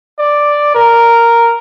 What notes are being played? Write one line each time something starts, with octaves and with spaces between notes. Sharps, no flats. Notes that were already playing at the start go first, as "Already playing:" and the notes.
D5
A#4